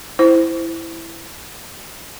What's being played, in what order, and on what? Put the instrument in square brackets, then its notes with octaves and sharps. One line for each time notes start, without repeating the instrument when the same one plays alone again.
[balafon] E4 C5